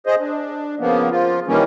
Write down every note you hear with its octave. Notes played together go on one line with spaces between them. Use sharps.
G#4 C5 D#5
D4
C#3 F3 A#3 B3
F3 F4
D#3 E3 G3 A#3 C#4